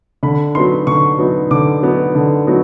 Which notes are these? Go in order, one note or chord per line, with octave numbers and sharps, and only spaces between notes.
D3 B5
F#3 B3 D#4 C6
D3 C#6
F#3 B3 D#4
D3 D6
F#3 B3 D#4
D3
F#3 B3 D#4